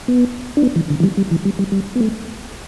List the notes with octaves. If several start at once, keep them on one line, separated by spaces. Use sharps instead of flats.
B3
D4
B3
E3
D3
E3
G3
G3
E3
G3
G3
G3
B3
A3